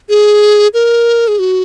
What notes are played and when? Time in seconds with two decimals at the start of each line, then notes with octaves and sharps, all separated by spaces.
0.09 G#4
0.74 A#4
1.28 G#4
1.39 F#4